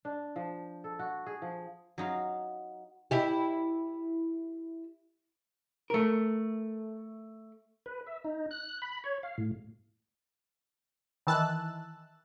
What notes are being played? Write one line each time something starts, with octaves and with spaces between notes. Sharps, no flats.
D4
F3
A4
F#4
G#4
F3
F#3 D#4 F4 F5
E4 G4
A3 A#4
B4
E5
D#4
F#6
B5
C#5
F5
A2
D#3 E3 A5 E6 F#6